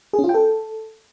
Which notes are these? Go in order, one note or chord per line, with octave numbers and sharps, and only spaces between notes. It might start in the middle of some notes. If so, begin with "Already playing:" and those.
G#4
C#4
F4
G5
A4